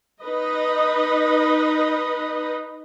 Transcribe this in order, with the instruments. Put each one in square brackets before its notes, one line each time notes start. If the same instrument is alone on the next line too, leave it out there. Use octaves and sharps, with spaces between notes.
[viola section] D#4 B4 D#5